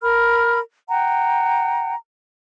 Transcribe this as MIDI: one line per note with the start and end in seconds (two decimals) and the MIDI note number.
0.03 0.59 70
0.03 0.59 83
0.03 0.59 89
0.89 1.94 78
0.89 1.94 79
0.89 1.94 82